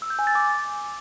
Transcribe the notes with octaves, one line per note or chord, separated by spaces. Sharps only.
E6
G6
G#5
A6
D6